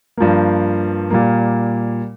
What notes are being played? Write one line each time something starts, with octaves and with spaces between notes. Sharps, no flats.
G2 F3 A#3
A#2 G3 A#3